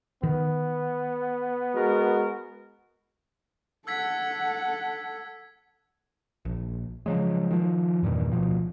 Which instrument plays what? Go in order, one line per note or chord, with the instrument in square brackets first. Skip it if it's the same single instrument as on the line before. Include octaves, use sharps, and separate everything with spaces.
[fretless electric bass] D#3 [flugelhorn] B3
[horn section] G#3 F#4 A#4
[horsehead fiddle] A4 F#5 [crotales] E6 G#6 B6
[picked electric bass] A#1
C#3 F3 F#3 G#3
D#3 F3
E2 G2 A#2 D#3
D1 B2 F3